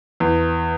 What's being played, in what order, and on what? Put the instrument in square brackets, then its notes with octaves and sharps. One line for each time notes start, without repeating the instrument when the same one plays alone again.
[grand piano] E2